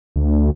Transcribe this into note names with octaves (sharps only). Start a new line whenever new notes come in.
D2